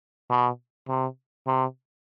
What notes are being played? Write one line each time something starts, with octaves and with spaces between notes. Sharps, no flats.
B2
C3
C3